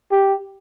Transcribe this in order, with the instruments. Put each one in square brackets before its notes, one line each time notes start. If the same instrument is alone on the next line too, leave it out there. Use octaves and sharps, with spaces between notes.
[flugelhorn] G4